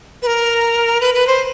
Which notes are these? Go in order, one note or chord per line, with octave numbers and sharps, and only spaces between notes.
B4
A#4
B4
B4
C5